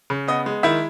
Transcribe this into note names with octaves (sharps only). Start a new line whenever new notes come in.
C#3
B3 D#5
G#3
D#3 E4 E5